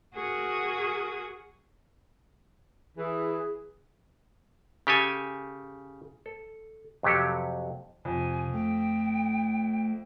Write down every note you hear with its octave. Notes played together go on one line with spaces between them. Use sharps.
F#4 G#4 A#4 C#6 D#6
E3 G#4
C#3 G4 A4 G#5
A4
F2 C3 F#3 G4 A4
F2 C3 G#5
A3 G5